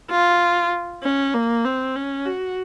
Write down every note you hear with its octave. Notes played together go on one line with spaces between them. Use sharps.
F4
C#4
A#3
C4
C#4
F#4